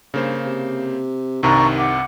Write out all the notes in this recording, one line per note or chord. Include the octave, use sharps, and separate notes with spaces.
G2 C#3 A#3 C5
C3
C2 G2 C3 D#3 D4 A#5 C#6
F#5 D6